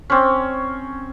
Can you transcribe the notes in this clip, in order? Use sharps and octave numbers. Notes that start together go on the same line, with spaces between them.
C4 C#4